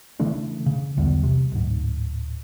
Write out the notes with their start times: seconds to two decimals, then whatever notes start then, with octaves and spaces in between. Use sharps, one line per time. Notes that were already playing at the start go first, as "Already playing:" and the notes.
0.20 C#3 E3 A3 D4
0.66 C#3
0.97 B1 E2 D3 G3
1.23 C3
1.52 D1 G#2